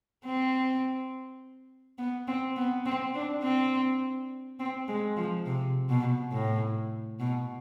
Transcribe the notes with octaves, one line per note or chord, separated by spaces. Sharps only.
C4
B3
C4
B3
C4
D4
C4
C4
G#3
F3
C3
B2
A2
B2